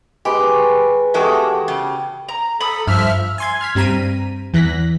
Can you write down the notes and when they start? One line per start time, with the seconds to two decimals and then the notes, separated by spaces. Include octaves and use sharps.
0.25 G#3 G4 B4
0.43 C#6
1.14 E2 G#3 F#4 G4 A4
1.68 C#3
2.29 A#5
2.61 A4 B5 D#6
2.87 G2 F3 E5 E6 F6
3.38 G#5 C6 G#6
3.61 F6 G#6 B6
3.75 G2 G3 C4 A#5 B6 D#7
4.54 E2 E3 F#6 A#6 B6